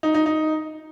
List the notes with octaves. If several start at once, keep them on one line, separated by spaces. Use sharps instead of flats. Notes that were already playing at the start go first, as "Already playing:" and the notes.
D#4
D#4
D#4